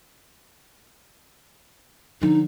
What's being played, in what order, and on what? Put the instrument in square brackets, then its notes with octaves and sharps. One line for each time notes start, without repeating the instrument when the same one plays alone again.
[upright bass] D3 F3 [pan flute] D#4